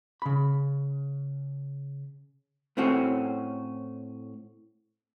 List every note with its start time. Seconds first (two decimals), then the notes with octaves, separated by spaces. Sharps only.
0.22 C#3 B5
2.77 A2 A3 C4 C#4 F#4